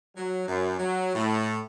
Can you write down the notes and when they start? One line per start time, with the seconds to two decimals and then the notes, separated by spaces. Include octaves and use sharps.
0.17 F#3
0.48 F#2
0.79 F#3
1.15 A2